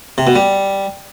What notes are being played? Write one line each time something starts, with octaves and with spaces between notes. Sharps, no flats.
C3
B2
G3